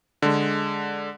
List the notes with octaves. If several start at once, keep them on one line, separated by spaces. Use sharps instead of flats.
D3 G#3